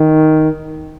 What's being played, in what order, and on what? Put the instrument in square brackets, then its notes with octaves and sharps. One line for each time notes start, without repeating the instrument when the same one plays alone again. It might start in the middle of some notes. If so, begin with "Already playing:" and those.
Already playing: [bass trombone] D#3